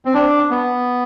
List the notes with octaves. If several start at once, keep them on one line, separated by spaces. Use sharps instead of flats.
C4
D4
B3